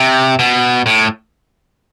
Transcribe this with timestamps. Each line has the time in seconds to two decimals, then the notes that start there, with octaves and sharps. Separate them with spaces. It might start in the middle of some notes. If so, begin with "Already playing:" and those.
Already playing: C3
0.39 B2
0.86 A2